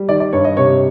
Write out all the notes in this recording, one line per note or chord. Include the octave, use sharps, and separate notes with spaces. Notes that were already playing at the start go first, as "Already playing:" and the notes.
Already playing: G3
D#3 D5
D5
G2 C#5
D#5
C3 C#5